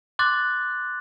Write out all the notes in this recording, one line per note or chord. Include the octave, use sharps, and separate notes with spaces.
C6 D6 F#6 A6